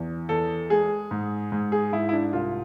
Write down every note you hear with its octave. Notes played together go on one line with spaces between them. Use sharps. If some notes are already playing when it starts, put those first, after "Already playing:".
Already playing: E2
E2 A4
G#3 G#4
G#2
G#2
G#4
G#2 E4
E4
D4
C2 F4